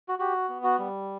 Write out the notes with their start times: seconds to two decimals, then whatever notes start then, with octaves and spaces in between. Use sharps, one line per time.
0.09 F#4
0.19 F#4 G4
0.49 B3
0.64 F#4
0.79 G3